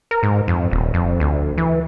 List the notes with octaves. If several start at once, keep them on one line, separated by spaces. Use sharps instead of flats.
A#4
G#2
F2
D#1
F2
D2
E3